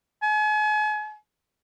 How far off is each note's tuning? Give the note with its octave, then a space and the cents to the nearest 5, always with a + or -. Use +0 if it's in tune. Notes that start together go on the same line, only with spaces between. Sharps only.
G#5 +40